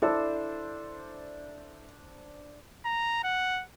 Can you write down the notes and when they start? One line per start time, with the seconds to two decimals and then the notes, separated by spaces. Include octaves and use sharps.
0.02 D4 E4 A4 C5
2.85 A#5
3.24 F#5